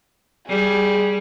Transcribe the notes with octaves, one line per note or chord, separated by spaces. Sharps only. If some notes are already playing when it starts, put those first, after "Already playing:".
G3 G#4